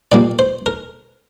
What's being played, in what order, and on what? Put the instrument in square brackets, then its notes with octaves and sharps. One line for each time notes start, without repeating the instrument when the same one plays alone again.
[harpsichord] A#2 G3 A#3 D5
C5
A#4